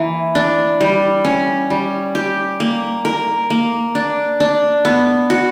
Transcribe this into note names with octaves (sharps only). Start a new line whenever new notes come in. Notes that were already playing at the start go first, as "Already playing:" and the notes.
Already playing: E3 A#3
D4
G3
C#4
G3
G4
A#3
A#4
A#3
D4
D4
B3
F#4